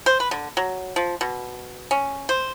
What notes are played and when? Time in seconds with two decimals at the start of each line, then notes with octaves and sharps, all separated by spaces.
0.06 C5
0.20 B4
0.31 D3
0.57 F#3
0.96 F3
1.21 B2
1.91 C#4
2.29 C5